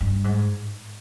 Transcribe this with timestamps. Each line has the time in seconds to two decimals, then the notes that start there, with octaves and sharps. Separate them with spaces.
0.01 G2
0.24 G#2